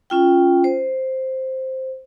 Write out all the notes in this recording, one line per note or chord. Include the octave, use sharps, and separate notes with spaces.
C#4 F4 G5
C5